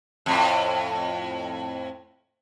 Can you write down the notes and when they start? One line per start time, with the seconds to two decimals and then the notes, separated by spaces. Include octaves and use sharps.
0.26 F2 A2